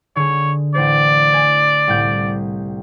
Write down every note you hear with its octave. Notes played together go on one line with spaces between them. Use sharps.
D3 G#4 C#5
A1 C5 D5
G#5
C2 A2 G6